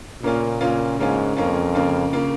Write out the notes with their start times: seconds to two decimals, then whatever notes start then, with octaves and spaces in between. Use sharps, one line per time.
0.23 A#2 C#3 A#3 C#4 F4
0.61 A#2 C#3 A#3 C#4 F4
0.99 G#2 C#3 A#3 C#4 F4
1.37 F2 C#3 A#3 C#4 F4
1.75 C#3 A#3 F4
2.13 C#3 A#3 F4